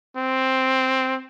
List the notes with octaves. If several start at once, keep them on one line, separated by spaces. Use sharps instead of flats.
C4